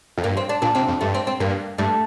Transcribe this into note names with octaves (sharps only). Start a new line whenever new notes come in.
F2
G2 A#3
C4
D4
A#2 D4
C3 C4
F2
G2 A3
C4
C4
G2 A#3
G2 A3